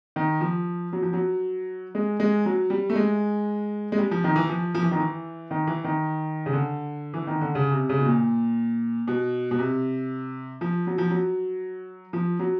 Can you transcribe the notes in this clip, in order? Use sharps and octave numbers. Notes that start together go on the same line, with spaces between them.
D#3
F3
F#3
F3
F#3
G#3
G#3
F#3
G3
A3
G#3
G#3
G3
F3
D#3
E3
F3
F3
E3
D#3
E3
D#3
E3
D#3
C#3
D3
E3
D#3
D3
C#3
C3
C#3
B2
A#2
B2
B2
C3
F3
F#3
F3
F#3
F3
F#3